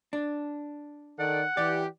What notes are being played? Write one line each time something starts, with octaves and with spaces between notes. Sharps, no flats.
D4
D#3 A4 D5 F#5
E3 G4 D5